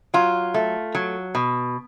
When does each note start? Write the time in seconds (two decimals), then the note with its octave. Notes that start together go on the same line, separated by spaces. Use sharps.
0.14 F#3 F4
0.54 A3
0.95 F#3
1.35 B2